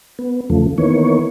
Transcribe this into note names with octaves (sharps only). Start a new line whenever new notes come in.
B3
E2 C#3 F3 A3
D#3 E3 A#3 B3 C#5